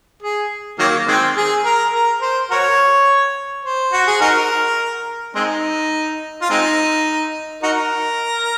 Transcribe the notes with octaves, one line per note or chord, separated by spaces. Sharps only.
G#4
D#3 F#3 A#3
D#3 G#3 C4
G#4
A#4
A#4
C5
F#4 A#4 C#5
C5
F#4
G#4
D#4 F#4 A#4
G#3 C4 D#4
F4
G#3 C4 D#4
D#4 F#4 A#4